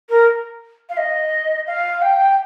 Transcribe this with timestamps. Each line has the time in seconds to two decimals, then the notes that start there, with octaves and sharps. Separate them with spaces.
0.09 A#4
0.89 F5
0.97 D#5
1.67 F5
2.02 G5